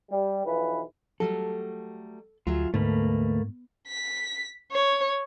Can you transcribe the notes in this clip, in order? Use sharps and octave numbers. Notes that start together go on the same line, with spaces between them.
G3
B1 E3 F3 B4
F#3 G3 A3 A4
D2 F#3 F4 G#4 E5
D2 G#2 B2 A3 A#3 B5
B6
C#5